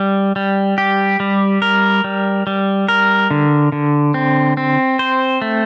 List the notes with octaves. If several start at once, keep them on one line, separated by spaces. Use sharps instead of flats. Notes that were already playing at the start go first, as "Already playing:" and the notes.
Already playing: G3
G3
G4
G3
A#4
G3
G3
A#4
D3
D3
C4
C4
C5
A3